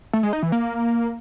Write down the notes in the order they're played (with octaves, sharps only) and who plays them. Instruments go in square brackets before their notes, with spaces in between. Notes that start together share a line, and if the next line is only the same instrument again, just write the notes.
[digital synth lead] A3
G#3
D#4
E3
A#3